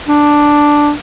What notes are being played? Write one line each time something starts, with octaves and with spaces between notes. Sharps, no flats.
D4